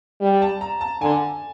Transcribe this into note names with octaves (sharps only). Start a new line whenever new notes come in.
G3
A5
A#5
A5
D3 G#5
A5